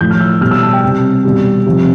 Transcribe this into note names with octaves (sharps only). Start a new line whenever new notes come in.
A2 F3 G6
F6
E6
B2 G3 F6
E6
A5
G5
C3 G3
B2 G3
C3 F3